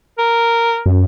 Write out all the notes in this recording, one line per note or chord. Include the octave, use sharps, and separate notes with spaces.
A#4
F#2